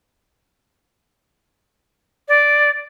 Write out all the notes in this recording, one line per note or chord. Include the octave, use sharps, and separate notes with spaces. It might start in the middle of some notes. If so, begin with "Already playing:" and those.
D5